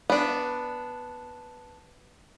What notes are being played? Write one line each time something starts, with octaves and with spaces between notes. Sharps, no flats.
B3 D4